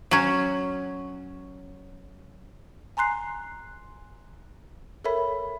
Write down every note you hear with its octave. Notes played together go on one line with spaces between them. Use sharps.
F#3 C#4
G#5 A#5 C6 F#6 C7
A4 A#4 C#5 E5 B5